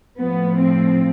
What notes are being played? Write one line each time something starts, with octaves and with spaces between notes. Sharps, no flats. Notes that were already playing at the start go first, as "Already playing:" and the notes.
A2 F3 B3
C4